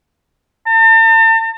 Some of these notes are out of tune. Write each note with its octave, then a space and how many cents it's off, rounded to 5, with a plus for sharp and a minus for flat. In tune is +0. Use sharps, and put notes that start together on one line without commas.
A5 +45